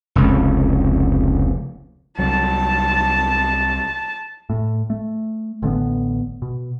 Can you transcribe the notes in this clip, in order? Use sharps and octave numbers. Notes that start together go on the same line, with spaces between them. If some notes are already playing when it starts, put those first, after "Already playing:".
F1 C#2
C2 F#3 A5
A2
A3
A1 D3 A#3 B3
B2